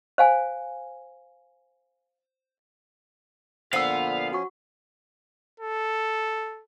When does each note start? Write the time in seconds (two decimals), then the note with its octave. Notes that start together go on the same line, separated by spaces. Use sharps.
0.18 C5 F5 G#5
3.73 A#2 D3 F3 B3 C5 F5 E6
4.32 F3 C#4 F#4 F#5 C#6
5.60 A4